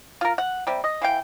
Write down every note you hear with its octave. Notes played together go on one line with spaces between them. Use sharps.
F4 A#4
F#5
C3 G3
D#5
E3 F5 G5